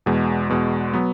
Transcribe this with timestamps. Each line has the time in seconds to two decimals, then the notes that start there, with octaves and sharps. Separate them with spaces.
0.06 E2 B2 G#3
0.49 E2 B2 G#3
0.93 F#3 B3